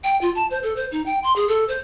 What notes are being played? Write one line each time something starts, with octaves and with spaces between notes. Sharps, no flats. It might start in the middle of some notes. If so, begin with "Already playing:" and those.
G5
F4
A5
C5
A4
C5
D#4
G5
C6
G#4
A4
C5